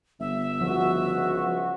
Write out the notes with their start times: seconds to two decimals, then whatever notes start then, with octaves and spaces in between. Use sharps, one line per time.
0.20 G1 E5
0.61 C#2 F3 F#4